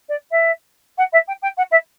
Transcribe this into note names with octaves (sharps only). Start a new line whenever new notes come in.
D5
E5
F#5
E5
G5
G5
F#5
E5